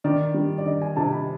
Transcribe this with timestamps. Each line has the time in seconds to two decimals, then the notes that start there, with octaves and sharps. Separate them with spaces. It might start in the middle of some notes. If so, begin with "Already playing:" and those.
0.04 D#3 D5
0.34 G3
0.58 D5
0.66 D#3 D#5
0.82 G#5
0.96 C3 A5
1.12 B5